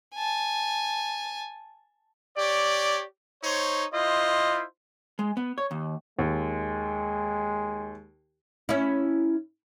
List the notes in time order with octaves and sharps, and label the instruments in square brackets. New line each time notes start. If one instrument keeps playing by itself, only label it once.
[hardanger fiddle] G#5 A5
[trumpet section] G4 C#5 D5
D#4 C5 C#5
E4 F4 C5 D#5
[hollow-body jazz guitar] G#3
B3
C#5
D#2
[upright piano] D#2 [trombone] G#3
[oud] C#4 E4